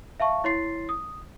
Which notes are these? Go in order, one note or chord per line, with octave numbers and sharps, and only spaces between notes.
E5 F5 A5 C#6
E4 C#5 C6 A6 C7
D#6